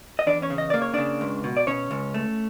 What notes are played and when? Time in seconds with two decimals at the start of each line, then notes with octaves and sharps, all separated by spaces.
0.19 D#5
0.27 E2 D4 D5
0.42 C#4 C#5
0.50 C#3
0.58 D#5
0.70 A#3 D5
0.82 C#5
0.94 C#3 D4 D5
1.21 C#2
1.44 B2
1.57 D5
1.67 B2 C#4 C#5
1.91 C#2
2.14 A3